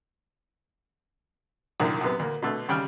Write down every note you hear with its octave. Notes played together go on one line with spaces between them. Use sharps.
C2 F#2 D3 D#3 F3 A#3
F#2 C3 B3
D2 A#3
B2 D3 A3 B4
D#2 C#3 G3 G5 F6